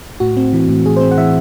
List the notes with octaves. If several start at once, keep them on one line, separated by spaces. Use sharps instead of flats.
A2 F#4
C4
E3
A2
A2 G#4
C5
C4
F#5
E3 E5